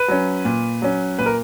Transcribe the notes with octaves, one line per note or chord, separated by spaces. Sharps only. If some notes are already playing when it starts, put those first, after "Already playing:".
Already playing: B4
F#3 C#4
A#2
F#3 C#4
A#2 B4
A#4